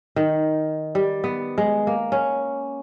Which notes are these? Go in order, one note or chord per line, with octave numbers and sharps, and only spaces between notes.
D#3
G3
B3
G#3
A#3
C#4